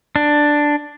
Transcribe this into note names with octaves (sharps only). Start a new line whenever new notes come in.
D4